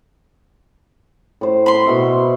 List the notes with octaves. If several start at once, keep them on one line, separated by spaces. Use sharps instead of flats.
A2 C5
B5 C6
B2 E5 C#6